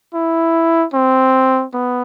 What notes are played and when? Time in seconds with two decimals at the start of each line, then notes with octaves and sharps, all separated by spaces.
0.14 E4
0.94 C4
1.74 B3